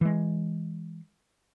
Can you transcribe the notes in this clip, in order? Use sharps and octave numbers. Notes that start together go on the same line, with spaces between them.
E3 G#3